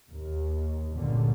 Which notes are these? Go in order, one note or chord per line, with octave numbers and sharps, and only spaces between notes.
D#2
G1 C#2 A#2 D3